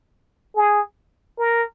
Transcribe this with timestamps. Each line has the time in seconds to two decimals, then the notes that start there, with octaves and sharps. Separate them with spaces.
0.56 G#4
1.39 A#4